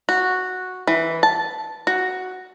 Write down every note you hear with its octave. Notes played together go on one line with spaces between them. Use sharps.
F#4
E3
A5
F#4